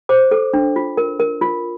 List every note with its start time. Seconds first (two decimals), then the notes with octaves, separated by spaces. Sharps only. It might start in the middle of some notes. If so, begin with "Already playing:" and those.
0.09 C5 D6
0.31 A4
0.54 D4
0.76 F4
0.97 A#4
1.20 A#4
1.41 F4